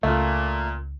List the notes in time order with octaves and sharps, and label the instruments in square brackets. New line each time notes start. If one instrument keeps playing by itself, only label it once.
[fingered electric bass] C#2 [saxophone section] A#2 [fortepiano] A3 F4